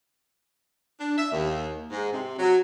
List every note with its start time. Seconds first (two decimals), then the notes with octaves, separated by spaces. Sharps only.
0.99 D4
1.18 E5
1.32 D#2
1.91 G#2
2.13 C3
2.39 F#3